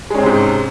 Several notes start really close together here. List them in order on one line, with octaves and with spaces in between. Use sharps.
G#3 C#4 C4 C3 G#2